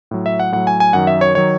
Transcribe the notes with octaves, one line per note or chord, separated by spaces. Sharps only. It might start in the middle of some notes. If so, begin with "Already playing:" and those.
A2 F#3
E5
F#5
A2 F#3 F#5
G#5
G#5
F#2 D#3 F#3 F#5
E5
C#5
D#3 F#3 C#5